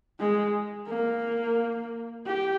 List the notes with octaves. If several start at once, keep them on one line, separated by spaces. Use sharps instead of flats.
G#3
A#3
G4